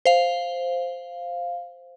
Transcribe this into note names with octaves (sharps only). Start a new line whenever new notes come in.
C5 F5